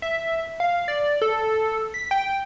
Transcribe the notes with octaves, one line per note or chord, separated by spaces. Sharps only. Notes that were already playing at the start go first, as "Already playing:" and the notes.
E5
F5
D5
A4
B6
G5